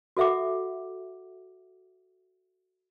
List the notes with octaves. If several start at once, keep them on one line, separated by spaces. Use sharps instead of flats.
F#4 A4 E5 F#5 D6